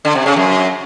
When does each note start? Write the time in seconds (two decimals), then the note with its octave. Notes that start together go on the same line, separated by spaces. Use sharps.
0.05 D3
0.15 C3
0.26 C#3
0.36 F#2